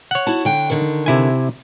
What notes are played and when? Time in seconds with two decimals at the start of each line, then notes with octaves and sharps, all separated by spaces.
0.11 C#5 F#5
0.27 E4 F#4 A5
0.45 D3 G5
0.70 D3 D#3
1.06 C3 E4 G#5